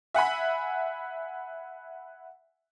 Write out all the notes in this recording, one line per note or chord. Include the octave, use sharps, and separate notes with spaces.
E5 F#5 G#5 B5